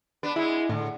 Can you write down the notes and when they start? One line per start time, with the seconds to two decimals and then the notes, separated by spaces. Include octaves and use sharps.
0.23 B3 D4 B4
0.36 G#3 B3 E4
0.69 A2 D3